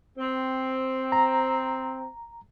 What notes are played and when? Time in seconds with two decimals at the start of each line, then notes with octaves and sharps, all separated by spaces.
0.18 C4
1.12 A#5